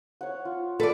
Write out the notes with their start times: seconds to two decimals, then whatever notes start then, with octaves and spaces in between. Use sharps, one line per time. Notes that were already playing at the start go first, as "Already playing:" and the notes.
0.21 C#5 F#5
0.45 F4
0.80 A4 B4 D5